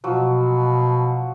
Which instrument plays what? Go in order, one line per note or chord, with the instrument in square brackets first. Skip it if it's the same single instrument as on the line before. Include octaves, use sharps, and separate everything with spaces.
[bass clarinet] B2 [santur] F3 F#3